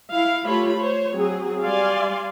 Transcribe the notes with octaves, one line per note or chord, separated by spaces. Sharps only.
E4 F5
A3 F4 G4 C#5 B5
C5 C#5
F#3 C4 G#4
G3 D5 F5 G#5 C6